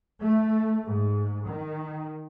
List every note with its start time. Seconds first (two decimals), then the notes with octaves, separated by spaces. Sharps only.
0.22 A3
0.86 G#2
1.47 D#3